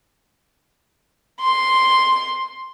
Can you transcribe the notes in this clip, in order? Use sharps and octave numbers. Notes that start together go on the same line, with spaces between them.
C6